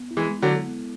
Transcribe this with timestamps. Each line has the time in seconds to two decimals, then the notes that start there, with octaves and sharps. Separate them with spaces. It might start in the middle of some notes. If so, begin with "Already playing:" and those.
Already playing: B3
0.11 E4
0.17 E3 G#3
0.30 G#3
0.42 D3 F#3
0.49 A4
0.68 B3